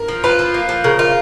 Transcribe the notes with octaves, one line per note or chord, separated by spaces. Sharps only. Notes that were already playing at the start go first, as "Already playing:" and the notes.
Already playing: A#4
F3
F4 B4
F3
A#3
F3
C#3 A#4
F4 A#4